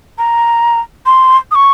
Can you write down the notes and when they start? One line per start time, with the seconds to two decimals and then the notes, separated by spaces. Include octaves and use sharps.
0.18 A#5
1.06 C6
1.51 D#6
1.55 C#6